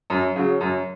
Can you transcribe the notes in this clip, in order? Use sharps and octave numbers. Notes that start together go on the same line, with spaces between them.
F#2
C#3 F#3
F#2